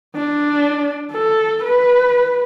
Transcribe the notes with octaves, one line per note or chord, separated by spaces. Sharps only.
D4
A4
B4